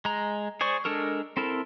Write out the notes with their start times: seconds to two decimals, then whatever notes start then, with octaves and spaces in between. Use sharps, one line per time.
0.05 G#3 A#5
0.61 G#4 C5 D5 C#6
0.85 G#3 D4 A4 A#4
1.37 C4 E4 A4 A#4